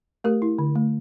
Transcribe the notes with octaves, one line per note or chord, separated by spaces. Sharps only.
A3 G4 A#4
E4
D3
A3